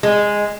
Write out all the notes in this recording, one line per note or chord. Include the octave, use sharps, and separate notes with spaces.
G#3